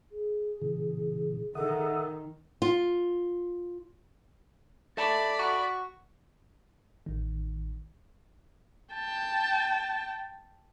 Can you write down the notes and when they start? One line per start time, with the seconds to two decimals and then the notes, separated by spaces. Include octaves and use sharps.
0.11 G#4
0.62 A#2 C#3 E3
1.55 D#3 A4 E5 F#5 D#6
2.62 F4
4.97 A4 D5 E5 A5 B5
5.39 F#4
7.06 A1 D#3
8.94 G5 A5